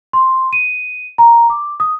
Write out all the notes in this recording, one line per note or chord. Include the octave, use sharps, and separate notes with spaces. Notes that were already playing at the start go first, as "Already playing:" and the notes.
C6
D#7
A#5
D6
D#6